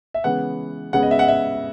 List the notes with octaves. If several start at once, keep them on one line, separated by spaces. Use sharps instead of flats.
E5
C#3 E3 G#3 B3 F#5
C#3 G#3 B3 F#5
D#5
E5
F#5
E5